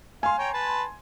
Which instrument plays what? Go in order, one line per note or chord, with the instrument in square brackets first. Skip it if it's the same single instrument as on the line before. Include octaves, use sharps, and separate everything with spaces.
[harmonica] F5 [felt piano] G#5 C6
[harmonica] C#5 G5 A#5
B4 A5